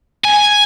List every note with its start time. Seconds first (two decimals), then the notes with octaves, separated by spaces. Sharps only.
0.25 G#5